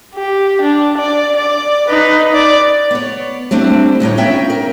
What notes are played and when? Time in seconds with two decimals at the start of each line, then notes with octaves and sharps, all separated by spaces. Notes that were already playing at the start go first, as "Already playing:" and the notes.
0.15 G4
0.61 D4
0.98 D5
1.37 D5
1.88 D#4 B4
2.34 D5
2.91 B3 C#5
3.51 G3 A3 C4 D4 E4
4.00 D2 A2 D#4 C#5
4.17 B3 C#4 D#4 F4 E5 G5
4.50 A#4